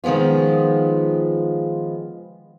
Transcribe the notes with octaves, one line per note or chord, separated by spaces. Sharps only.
D#3 F3 G#3 B3 F4